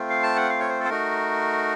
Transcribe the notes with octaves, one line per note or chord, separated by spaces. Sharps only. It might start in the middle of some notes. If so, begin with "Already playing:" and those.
Already playing: A3 C4 F4
F5
A5
F#5
F5
C#5
C5
A4
C5
A3 D#4 F#4 A#4